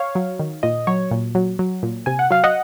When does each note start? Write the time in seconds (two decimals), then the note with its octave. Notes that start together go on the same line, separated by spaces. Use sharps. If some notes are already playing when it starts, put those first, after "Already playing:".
Already playing: C#5 F5
0.15 F#3
0.39 D#3
0.63 A#2 D#5
0.87 F#3 C#5
1.11 A#2
1.35 F#3
1.59 F#3
1.83 A#2
2.06 C3 G#5
2.19 F#5
2.31 F#3 F5
2.44 D#5 F#5